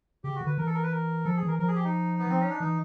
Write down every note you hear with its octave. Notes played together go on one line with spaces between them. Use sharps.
C#3 G4
F#4
D3
B4
E3 A#4
A4
A#4
B4
A#4
F3 A4
G#4
E3 A#4
F3 A#4
G#4
G4
D#4
B3
F3 C4
C#4
D4
E3 D#4